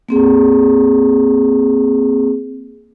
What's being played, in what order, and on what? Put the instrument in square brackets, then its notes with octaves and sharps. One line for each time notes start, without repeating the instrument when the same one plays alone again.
[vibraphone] A#3 C4 G#4